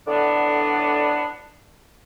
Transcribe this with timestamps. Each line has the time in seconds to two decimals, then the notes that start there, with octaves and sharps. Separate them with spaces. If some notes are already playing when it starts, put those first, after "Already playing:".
0.08 A2 D3 B3 D4